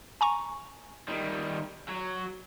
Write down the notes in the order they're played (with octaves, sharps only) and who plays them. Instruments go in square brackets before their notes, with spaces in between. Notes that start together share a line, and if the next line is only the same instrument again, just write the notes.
[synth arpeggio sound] G#5 A#5 C#6
[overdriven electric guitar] D#3 G3
F#3